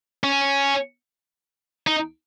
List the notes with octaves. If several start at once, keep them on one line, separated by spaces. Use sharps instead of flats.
C#4
D#4